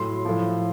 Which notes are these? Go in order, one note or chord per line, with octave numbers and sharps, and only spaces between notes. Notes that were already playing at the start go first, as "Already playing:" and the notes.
Already playing: A2 F#3 C6
A2 F3